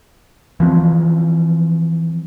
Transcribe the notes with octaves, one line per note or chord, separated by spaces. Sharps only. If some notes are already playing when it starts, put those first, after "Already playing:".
E3 F3 C4